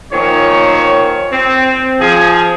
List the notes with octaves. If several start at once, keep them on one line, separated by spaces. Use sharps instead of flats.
A#2 D#3 F3 C#5
C4
F3 G#4